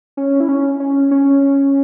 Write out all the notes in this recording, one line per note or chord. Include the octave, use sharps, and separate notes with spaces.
C#4
E4
C#4
C#4
C#4